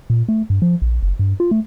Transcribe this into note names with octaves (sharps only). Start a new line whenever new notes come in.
A#2
A3
G2
F3
A#1
F#1
G2
F4
A3